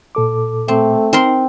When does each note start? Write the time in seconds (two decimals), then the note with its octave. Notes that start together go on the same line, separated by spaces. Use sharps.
0.15 A#2 A4 D6
0.68 A3 C4
1.13 C4 D#4 A#4 C6